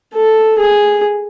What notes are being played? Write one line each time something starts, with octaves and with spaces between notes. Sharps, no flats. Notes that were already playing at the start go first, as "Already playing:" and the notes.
A4
G#4